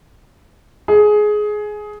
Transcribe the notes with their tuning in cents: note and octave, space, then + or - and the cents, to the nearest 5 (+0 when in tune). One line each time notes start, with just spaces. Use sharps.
G#4 +15